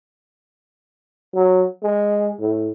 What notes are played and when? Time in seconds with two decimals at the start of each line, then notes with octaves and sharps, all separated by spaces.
1.35 F#3
1.83 G#3
2.40 A2